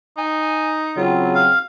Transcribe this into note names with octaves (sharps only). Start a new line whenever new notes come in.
D#4 G#5
C#3 F#3 C4 F4
F5